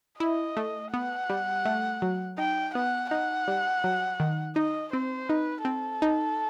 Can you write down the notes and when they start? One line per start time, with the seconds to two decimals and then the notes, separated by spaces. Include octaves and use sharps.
0.20 E4 D#5
0.57 A3
0.93 B3 F#5
1.29 G3
1.65 A3
2.02 F#3
2.38 D#4 G5
2.75 B3 F#5
3.11 D#4 F#5
3.48 G3
3.84 F#3
4.20 D#3
4.56 D#4 D#5
4.93 C4 C5
5.29 D#4 B4
5.65 C4 A4
6.02 D#4